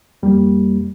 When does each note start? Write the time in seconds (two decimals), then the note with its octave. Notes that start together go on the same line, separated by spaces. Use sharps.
0.23 F2 G3 A#3